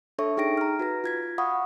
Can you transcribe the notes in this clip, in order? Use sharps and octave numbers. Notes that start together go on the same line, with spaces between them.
D4 A4 C#5 E5 C#6
D#4 G#4 G5 A#6 D7
A#5 F6
F#4 B4 A#6
F4 G#6 B6
F5 F#5 B5 C#6 D#6